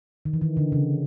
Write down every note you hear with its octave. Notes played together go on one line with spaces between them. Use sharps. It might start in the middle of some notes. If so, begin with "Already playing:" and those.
D#3
E3
D#3
D3
C#3